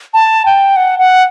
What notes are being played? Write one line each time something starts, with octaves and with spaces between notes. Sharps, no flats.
A5
G5
F#5
F#5